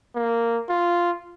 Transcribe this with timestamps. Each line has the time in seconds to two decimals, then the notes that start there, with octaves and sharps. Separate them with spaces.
0.15 A#3
0.69 F4